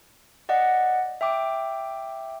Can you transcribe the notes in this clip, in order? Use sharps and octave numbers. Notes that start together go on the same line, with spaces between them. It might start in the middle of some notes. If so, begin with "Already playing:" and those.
D5 D#5 F#5
E5 G5 D6